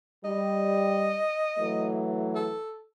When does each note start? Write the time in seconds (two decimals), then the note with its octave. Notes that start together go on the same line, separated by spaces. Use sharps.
0.24 G3 D#5
1.58 E3 F#3 A3
2.35 A4